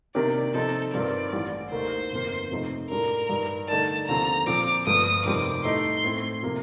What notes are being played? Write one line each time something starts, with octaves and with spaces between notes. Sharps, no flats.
C3 D#3 A#3 D4 G4 D5
C3 F3 C4 D#4 A4
G2 D#3 G3 C4 F4 D5
A1 A2 G3
D#2 D#3 A3 C5
G1 F2 D#3 A#3
F2 C3 F3 A3 D#4
A2 G3 D4 F4 A4 A#4
G2 D#3 G3
D3 A3 D#4 A#4 D5 A5
D#2 D3 F3 C4 A#5
A#2 F3 C4 D6
G1 G2 F3 A3 D#6
F1 F2 D#3 G3 C4 D6
A2 A3 D#4 A4 C6
A2 A3 C4
C3 F3 A#3